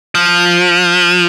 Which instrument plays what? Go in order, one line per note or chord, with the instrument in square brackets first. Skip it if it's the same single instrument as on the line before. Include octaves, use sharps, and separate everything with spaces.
[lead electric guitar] F3